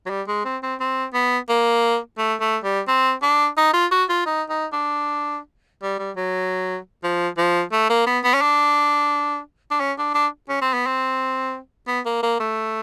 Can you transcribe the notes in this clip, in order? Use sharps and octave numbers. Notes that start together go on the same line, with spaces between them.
F#3
G3
G#3
C4
C4
C4
B3
A#3
A3
A3
G3
C4
D4
D#4
F4
F#4
F4
D#4
D#4
D4
G3
G3
F#3
F3
F3
A3
A#3
B3
B3
C#4
D4
D4
C#4
D4
D4
C#4
C4
B3
C4
B3
A#3
A#3
A3